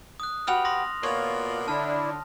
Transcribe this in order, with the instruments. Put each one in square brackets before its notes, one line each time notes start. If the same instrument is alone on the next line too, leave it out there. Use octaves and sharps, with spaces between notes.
[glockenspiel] D#6 F#6
[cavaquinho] F#4 G4 B4 [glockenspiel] F6 F7
[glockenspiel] C6 D#6 A#6
[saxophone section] B2 A#3 D5 [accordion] F4 [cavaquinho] C#5
[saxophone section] D3 [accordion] D4 E4 [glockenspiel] A5 F6